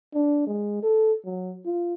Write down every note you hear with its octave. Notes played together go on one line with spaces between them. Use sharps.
D4
G#3
A4
F#3
F4